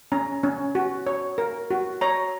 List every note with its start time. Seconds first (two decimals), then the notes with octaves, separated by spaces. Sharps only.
0.12 C#4 A#5
0.43 C#4
0.75 F#4
1.06 C#5
1.38 A#4
1.71 F#4
2.01 C#5 A#5